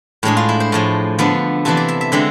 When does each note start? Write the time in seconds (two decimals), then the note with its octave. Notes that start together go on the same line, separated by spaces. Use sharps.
0.23 A2 G#3 D4 G#4
0.37 F4
0.49 E4
0.60 C5
0.72 A2 F3 G#3
1.19 D3 F3 B3 D4
1.65 C3 E3 B3 D4 A4
1.77 D5
1.88 E5
2.01 E5
2.12 D3 G#3 C4 E5